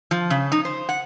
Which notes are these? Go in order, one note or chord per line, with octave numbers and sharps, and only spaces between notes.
F3
C#3
D#4
C5
F#5